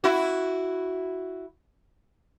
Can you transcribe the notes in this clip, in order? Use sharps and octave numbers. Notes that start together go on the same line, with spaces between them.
E4 F#4